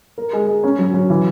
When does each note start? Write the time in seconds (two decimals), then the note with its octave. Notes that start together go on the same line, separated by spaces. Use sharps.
0.18 A#4
0.33 G#3
0.47 G#3
0.64 C#4
0.79 F#3
0.94 F#3
1.10 E3